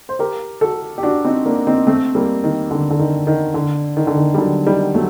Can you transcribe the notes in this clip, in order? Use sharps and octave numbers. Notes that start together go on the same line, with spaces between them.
C5
G4 A#4
F#4 A4
G4
D4 F#4
C4 D#4
A#3 D4
C4 D#4
A3 C4
G3 A#3
D#3
D3
D3
D#3
D#3
D3
D#3
D3
D#3
G3
D3 F#3
D#3 G3
F#3 A3